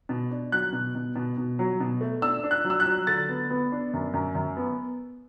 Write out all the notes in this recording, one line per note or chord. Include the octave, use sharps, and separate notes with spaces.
B2
D4
F#3 F#6
B2
B2
B2
B2
F#3
B2
A3
D4 E6
D4
F#6
F#3
E6
F#6
F#3
D3 A6
B3
B3
D4
F#2
F#2
F#2
B3